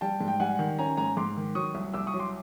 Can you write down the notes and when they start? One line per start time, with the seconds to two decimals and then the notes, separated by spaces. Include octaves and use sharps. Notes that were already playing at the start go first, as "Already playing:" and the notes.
0.01 G3 G5 A5
0.20 G#2
0.28 G5
0.40 G3 F#5 G#5
0.59 D#3
0.78 C#4 G#5 A#5
0.97 G#2 G#5 A#5
1.17 G#2 C6 D6
1.37 D#3
1.55 F#3 C#6 D#6
1.75 C2
1.94 C2 D6 E6
2.07 C#6 D#6
2.14 F#3
2.19 C6 D6